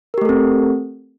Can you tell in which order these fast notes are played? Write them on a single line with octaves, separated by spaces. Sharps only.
A#4 G4 A3 A4 C4